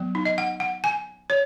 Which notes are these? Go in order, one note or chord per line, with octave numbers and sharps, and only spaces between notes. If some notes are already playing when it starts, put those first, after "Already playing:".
Already playing: F#3 B3
D#4
D#5
F#5
F#5
G#5
C#5